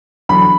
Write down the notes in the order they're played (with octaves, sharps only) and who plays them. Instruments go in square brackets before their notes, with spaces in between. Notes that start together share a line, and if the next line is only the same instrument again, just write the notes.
[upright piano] E2 D3 F#3 [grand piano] B5